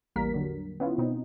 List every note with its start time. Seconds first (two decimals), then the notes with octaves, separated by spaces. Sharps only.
0.16 A1 E2 G3 A#3 A#4 B6
0.34 D3 F#3
0.80 B3 C#4 E4 F4
0.98 B2 B3 C4 D#4